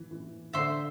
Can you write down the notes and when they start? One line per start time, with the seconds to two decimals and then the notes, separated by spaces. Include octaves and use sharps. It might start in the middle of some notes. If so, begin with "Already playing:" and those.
Already playing: E3
0.11 E3
0.53 D3 C5 E5 C6